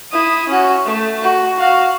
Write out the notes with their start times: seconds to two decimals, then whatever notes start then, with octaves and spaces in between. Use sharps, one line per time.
0.12 E4 D#6
0.49 C#4 F#4
0.86 A3
1.23 F#4
1.59 F#4 F5